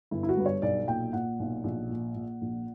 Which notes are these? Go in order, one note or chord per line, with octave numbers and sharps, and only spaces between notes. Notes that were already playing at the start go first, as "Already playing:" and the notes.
G1 E4
E4
F#4
G2 B4
C#5
B1 D5
A#2 G5
A#2 F#5
B1
A#1
A#2
A#2
A#1